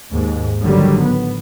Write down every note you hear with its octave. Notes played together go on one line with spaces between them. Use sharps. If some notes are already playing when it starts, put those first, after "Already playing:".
D#2 G#2
A1 D3 D#3 F#3 G3
B3